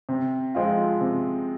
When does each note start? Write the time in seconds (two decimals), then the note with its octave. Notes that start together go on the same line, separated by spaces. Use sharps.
0.09 C3
0.55 F3 G#3 C4 F4
1.01 C3